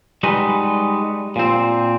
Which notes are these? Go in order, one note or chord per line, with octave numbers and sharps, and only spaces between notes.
G3 G#3 D#4 F#4 B4
A#2 C4